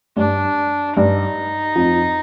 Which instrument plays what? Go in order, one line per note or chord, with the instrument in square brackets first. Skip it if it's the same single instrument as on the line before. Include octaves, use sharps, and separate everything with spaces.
[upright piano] G2 G3 [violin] D4
[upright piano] G2 G3 [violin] D#4
[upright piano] F2 F3